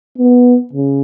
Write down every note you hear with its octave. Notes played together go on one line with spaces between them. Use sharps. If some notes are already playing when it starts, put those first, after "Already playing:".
B3
C#3